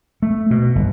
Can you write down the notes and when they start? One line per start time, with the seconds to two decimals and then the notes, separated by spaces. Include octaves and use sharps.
0.22 A3
0.51 B2
0.75 G1